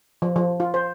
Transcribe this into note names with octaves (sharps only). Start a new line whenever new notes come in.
F3
F3
F4
C5